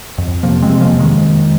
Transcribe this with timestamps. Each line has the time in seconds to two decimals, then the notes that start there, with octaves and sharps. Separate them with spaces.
0.18 F2
0.43 C3 F3 A#3
0.62 G#3 C4
0.68 C3
0.81 F3 A#3
0.94 F2
0.99 D#3 G#3
1.18 F2